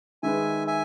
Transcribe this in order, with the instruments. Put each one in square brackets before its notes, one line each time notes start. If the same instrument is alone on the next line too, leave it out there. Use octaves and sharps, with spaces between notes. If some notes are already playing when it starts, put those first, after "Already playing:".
[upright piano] D#3 G#3 D#4 G#4 B4 [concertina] E5 G#5
[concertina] E5 G#5